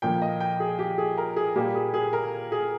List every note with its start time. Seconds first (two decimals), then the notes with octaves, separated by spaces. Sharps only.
0.02 A#2 F3 A#3 G5
0.22 D#5
0.40 G5
0.60 G#4
0.79 G4
0.98 G#4
1.18 A#4
1.36 G#4
1.56 A#2 G3 A#3 G4
1.75 G#4
1.94 G#4
2.13 A#4
2.52 G#4